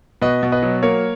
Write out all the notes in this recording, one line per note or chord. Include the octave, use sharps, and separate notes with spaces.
B2 B4 D#5
B2
B4 D#5
F#3
A#3 A#4 C#5